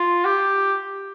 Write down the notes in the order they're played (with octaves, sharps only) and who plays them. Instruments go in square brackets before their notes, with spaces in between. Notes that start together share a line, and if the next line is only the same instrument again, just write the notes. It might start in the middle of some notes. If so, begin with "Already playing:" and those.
Already playing: [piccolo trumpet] F4
G4